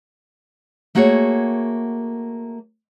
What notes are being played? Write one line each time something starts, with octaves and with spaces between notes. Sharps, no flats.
A3 A#3 F#4 G#4 C#5